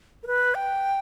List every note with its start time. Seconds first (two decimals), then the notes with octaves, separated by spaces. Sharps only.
0.23 A#4
0.27 B4
0.55 G5